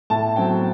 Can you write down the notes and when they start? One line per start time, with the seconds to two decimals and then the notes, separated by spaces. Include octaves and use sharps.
0.10 A2 A5
0.36 F#3 A3 C4 G5